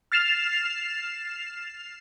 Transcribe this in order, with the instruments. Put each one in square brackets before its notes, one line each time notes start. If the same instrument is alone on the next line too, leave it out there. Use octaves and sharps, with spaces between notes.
[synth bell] F6 A6 C7 E7 F7